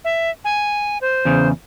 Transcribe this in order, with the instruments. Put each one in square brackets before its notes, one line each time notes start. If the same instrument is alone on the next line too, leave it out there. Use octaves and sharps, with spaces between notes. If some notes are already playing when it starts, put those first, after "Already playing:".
[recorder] E5
G#5
C5
[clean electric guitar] E2 C#3